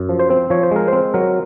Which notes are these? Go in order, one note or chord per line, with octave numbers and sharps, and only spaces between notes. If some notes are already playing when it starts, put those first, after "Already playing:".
Already playing: F#2
F3
C5
C4
F3 C#5
C5
G#3 A#4
C5
C4
F#3 A#4